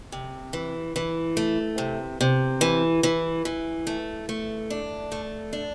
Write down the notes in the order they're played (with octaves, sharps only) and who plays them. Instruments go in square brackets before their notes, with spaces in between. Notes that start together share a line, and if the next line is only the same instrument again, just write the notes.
[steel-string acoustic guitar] C3
E3
E3
A3
C3
C3
E3
E3
E3
A3
A3
D4
A3
D4